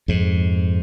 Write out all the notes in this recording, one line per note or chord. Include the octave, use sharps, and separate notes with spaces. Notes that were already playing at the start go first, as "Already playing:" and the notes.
F2 G#2